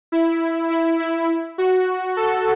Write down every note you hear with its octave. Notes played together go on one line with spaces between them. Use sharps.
E4
E4
E4
F#4
A4